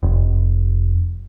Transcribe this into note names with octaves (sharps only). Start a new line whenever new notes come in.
F1